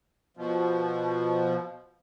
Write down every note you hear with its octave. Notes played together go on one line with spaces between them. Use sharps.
B2 F3